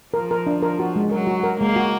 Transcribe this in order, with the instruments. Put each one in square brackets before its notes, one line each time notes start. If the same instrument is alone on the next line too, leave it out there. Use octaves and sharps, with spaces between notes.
[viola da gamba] F3 [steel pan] A#4
[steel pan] A#4
D4
A#4
F#4
G#3
[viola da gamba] F#3 [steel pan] A#4
[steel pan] F#4
A#4
[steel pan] G#3 [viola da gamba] A#3
[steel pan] F#4